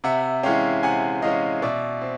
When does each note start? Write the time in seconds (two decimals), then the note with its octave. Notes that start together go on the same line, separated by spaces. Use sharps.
0.04 C3 E5 F#5
0.43 E3 G#3 C#4 F5 G5
0.83 C3 F#5 G#5
1.22 E3 G#3 C#4 D#5 F5
1.62 B2 D5 E5
2.02 C4